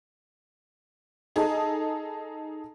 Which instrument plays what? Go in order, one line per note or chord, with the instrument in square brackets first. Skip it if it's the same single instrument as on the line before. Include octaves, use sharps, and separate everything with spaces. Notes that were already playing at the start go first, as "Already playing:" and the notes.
[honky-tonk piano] D#4 G#4 A4 D#5